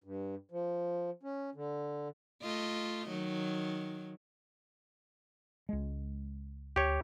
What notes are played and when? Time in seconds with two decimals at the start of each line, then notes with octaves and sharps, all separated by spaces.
0.04 G2
0.51 F3
1.23 C#4
1.55 D3
2.43 A3 F4 D#5
3.08 D#3 F#3
5.69 C#2 G#3
6.76 D2 G4 C#5